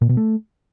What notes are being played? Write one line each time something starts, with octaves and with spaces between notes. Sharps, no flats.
A#2
B2
A3